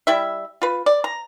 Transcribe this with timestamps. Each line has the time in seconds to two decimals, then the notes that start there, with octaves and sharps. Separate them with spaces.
0.07 G3 E4 E5
0.62 F4 B4
0.86 D5
1.04 A#5